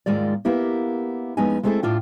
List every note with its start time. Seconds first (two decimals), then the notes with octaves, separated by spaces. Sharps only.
0.06 D#2 G#2 D#3 G#3 F4 D5
0.45 A#3 B3 E4 G4
1.37 F2 G#3 B3 C#4 D#4 G#5
1.63 G#3 A3 C4 E4 G#4 A4
1.83 A2 D4 F4 G5